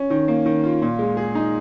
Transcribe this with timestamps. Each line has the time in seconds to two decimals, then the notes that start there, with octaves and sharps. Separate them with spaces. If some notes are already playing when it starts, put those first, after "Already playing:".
Already playing: C#4
0.10 D#3
0.28 A#3
0.46 D#3
0.64 F4
0.82 A#2
0.99 G#3
1.17 G#4
1.35 D#4